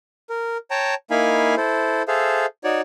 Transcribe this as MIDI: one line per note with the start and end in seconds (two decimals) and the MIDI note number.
0.30 0.57 70
0.71 0.95 73
0.71 0.95 79
0.71 0.95 81
0.71 0.95 82
1.11 1.55 58
1.11 1.55 63
1.11 1.55 64
1.11 1.55 77
1.11 1.55 80
1.11 1.55 83
1.57 2.03 64
1.57 2.03 69
1.57 2.03 72
2.08 2.46 68
2.08 2.46 69
2.08 2.46 72
2.08 2.46 76
2.08 2.46 77
2.64 2.81 63
2.64 2.81 66
2.64 2.81 73
2.64 2.81 74